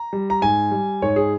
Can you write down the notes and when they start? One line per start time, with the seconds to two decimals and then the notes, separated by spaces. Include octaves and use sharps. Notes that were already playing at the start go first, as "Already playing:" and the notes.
Already playing: A#5
0.13 G3
0.30 A#5
0.42 G#2 G#5
0.71 G3
1.02 G#2 C#5
1.16 G#4